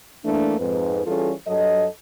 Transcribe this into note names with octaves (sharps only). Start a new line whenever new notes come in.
E3 A3 A#3 D4
F2 G#2 B4
E3 G3 C#4 F4 G#4 A4
G2 F#3 A4 D#5